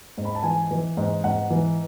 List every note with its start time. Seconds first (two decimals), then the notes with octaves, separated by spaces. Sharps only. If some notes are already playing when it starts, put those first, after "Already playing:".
0.18 G#2
0.25 B5
0.35 A5
0.43 E3 G#5
0.71 E3
0.97 G#2
1.24 G#2 F#5
1.50 E3